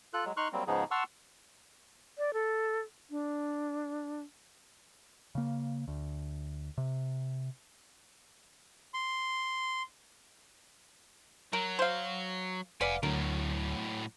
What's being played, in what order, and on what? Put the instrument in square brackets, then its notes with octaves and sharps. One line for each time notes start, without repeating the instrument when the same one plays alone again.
[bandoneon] F4 A4 F#6
F#3 G#3
D#4 C6 C#6 F6 F#6
F#3 G3 A#3 C4
G#2 C#3 F3 B3 D#4 G#4
F#5 A5 C6 C#6 E6 F6
[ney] D5
A4
D4
[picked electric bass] C#3 A#3
D2
C3
[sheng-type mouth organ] C6
[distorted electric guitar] F#3 [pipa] A#4
[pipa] C5 F5
[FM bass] F1 [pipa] B4 D5 F5 [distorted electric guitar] F#5 G#5
[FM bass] D2 [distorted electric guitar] A2 F#3 [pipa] A#4